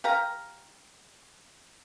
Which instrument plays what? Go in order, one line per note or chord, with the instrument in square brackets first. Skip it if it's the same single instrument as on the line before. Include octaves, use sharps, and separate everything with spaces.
[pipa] G4 F5 A#5